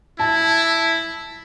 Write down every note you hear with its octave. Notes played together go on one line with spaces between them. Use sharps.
E4 A5